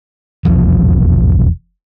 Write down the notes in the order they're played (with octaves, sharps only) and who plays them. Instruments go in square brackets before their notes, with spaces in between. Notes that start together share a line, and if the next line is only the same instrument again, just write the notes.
[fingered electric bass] F1 B1 E2 F3